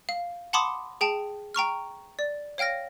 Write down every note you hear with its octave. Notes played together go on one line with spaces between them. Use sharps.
F5
F#5 A5 B5 C6 D6 D#6
G#4 G5 A5
G5 A#5 C#6 F6
D5
C#5 F5 G5 F6 A#6